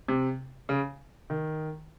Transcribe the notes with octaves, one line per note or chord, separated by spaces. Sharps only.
C3
C#3
D#3